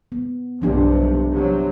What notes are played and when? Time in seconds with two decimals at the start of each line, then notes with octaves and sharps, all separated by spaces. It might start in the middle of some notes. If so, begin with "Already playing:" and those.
0.12 B3
0.62 B1 G2 C3 F3 D4 G4
1.31 C3 F#3